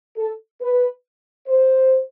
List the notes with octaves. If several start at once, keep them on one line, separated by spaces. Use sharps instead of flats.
A4
B4
C5